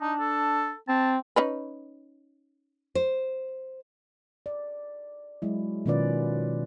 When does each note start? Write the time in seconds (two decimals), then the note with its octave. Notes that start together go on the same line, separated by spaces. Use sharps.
0.01 D4 D#4
0.20 A4
0.88 C4 A5
1.36 C#4 D#4 B4
2.95 C5
4.46 D5
5.42 F#3 G#3 E4
5.86 B2 D#3 C#4 F4 B4 D5